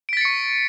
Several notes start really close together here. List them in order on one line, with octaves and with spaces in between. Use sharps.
D7 B6 A6 C#7 C#6